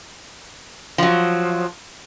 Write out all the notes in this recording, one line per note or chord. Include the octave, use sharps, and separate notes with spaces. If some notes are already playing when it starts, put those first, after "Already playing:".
F3 F#3